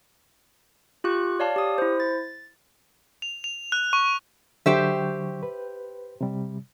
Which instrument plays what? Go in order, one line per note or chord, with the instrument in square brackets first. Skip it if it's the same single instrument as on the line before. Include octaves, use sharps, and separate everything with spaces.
[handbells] F4 G4 C#6 F#6
C#5 D5 F5 A5
G4 D#6
E4 C5
A6
[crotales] F7
F7
F#6
C#6
[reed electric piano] D3 F#3 C#6 [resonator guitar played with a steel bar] G4 C5 E5
[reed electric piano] B4
C3 G3